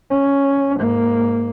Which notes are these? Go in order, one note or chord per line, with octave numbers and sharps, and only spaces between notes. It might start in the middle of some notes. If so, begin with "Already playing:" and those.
C#4
G#2 A#3